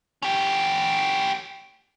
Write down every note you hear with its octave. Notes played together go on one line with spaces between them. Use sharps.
C#4 G4